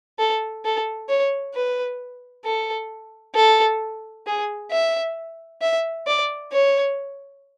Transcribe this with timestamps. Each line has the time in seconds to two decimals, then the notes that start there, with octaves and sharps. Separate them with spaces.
0.19 A4
0.65 A4
1.09 C#5
1.55 B4
2.45 A4
3.35 A4
4.27 G#4
4.71 E5
5.62 E5
6.07 D5
6.52 C#5